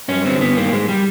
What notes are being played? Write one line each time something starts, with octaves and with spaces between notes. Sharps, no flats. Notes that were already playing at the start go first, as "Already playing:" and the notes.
G2 C#4
D3 C4
G2 B3
D#3 A#3
G#2 G#3
G3